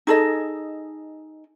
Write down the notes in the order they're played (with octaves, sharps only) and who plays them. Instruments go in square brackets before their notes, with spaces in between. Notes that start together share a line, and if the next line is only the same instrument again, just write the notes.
[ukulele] D#4 G#4 A4 D#5